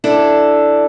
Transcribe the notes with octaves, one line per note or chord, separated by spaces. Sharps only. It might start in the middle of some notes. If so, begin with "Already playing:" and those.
D4 E4 A4